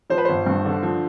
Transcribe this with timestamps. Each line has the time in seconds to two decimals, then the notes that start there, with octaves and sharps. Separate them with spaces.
0.10 F3 C5
0.18 B4
0.25 G1 C5
0.46 G2
0.65 D3
0.83 F3